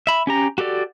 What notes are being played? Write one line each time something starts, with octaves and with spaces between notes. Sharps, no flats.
E5 B5
C#4 G4 A#5
F#4 G4 A4 D5